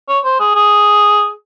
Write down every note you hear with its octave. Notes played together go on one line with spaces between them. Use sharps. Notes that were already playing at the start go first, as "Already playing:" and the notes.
C#5
C5
G#4
G#4